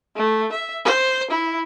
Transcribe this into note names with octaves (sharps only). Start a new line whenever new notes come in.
A3
E5
C5
E4